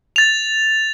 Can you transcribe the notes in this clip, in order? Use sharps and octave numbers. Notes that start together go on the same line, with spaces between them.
A6 F7